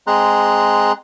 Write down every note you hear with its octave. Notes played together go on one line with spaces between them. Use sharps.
G#3 C4 G#4 A#5 C6 F#6